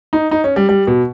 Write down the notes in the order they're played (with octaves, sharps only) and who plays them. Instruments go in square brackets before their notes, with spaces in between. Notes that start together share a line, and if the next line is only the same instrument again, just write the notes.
[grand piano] D#4
D#4
C#4
G3
G3
B2